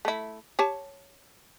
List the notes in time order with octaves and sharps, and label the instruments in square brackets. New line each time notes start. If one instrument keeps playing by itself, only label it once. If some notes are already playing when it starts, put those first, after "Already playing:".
[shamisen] A3 E4
G4 C#5 A5